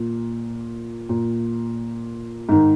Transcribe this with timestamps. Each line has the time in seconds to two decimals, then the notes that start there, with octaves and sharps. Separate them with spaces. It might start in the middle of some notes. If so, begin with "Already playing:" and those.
Already playing: A#2
1.09 A#2
2.49 G#2 D#3